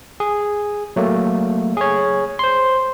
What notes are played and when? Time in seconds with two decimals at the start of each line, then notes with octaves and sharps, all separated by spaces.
0.20 G#4
0.96 F#3 A3 A#3
1.77 G#4 C#5
2.39 C5 C6